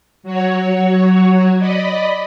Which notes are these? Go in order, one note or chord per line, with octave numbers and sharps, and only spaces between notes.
F#3 F#4 C#5
D5 D#5 B5